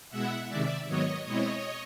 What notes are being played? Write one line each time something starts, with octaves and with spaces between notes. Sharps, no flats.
B2 G#3 B3 E4 E5 F#5
C3 D#3 G#3 D5 E5
G#2 D#3 F#3 B3 C#5 D#5
B2 G#3 C4 E4 C#5 D#5